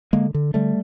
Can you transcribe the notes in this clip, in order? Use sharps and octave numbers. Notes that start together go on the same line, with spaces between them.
D3 G#3 A#3
D3
D3 G3 A3